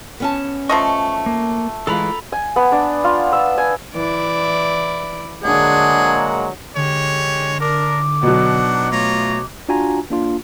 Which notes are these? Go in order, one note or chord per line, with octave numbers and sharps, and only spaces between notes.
B3 C#4 A5
F3 A3 D#5 C#6
A#3
E3 G#3 F4 A4 A#5 B5
G#5
B3
D4
F4
E6
G#5
E3 E4 D5
D3 F#3 G#3 A#3 D4 G#4 F#5
D3 G#3 G4 C#5
D4 A#4 D6
B2 F#3 D4 D#4 F#5
A3 F4 C#5 A#5
D4 F4 F#4 G#5 A#5
A#3 D4 F4